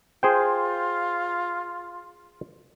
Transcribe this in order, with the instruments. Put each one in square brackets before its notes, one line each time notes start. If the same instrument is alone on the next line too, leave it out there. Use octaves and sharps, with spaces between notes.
[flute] F4 [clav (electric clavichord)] G#4 C5 G5